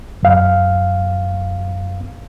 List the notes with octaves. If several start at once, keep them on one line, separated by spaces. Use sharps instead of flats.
F#2 F5